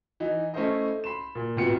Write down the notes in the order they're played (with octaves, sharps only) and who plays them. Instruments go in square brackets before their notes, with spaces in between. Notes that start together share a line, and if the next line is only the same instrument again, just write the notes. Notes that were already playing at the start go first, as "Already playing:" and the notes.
[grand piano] E3 D#4
A3 C#4 E4 A4 C5 D#5
B5 C6 E7
A#2
D1 C3 B3 F4 C#7